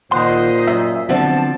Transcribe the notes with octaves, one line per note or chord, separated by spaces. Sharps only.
A#2 D#3 C5 D#5 F#5 C6
F#2 E5
D3 F3 F#3 B3 C4 A5